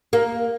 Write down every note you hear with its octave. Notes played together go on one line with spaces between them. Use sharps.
A#3